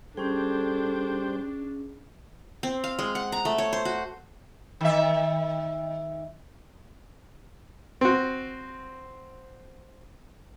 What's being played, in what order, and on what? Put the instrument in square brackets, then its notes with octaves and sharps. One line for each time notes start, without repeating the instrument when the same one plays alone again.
[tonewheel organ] G3 C5 G5 [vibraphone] C#4 G#4 [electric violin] D4 [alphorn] A4
[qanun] C4
F5
G#3
F#5
A#5
A3
C#5
C5
F#4
[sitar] D#3 E5
[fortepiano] C4 F#4